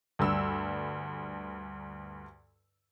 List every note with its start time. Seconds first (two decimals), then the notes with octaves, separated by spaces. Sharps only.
0.19 D2 G2 E6